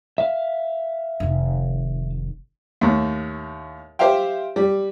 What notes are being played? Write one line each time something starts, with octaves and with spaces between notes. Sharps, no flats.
E5 F5
F1 D#3
D#2 A2
G4 C5 E5 F5 G5
G3